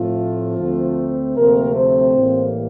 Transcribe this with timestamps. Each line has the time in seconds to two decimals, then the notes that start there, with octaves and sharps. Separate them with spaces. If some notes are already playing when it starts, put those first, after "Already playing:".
Already playing: A2 F3 A3 C4 F4
0.58 D2 D3 A3 C4
1.36 D2 C3 F3 A3 A#3 C4 A#4
1.75 C4 C5
2.15 A1 A2 G3 A#3